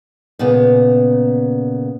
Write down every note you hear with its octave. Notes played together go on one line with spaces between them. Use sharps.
A#2 C#3 B3